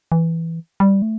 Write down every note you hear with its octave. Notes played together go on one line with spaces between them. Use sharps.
E3
G3
A3